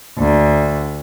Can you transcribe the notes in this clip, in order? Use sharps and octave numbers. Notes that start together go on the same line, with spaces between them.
D2